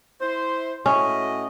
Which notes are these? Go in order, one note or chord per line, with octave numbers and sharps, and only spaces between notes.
E4 C5
A2 C#4 F#4 D#5